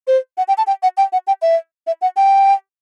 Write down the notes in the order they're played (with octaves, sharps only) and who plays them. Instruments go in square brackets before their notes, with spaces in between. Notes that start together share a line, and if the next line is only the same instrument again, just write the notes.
[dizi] C5
F#5
G5
A5
G5
F#5
G5
F#5
G5
E5
E5
F#5
G5